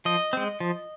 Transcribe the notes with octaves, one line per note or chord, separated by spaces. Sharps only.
F3 D#5
G#3 C4
F3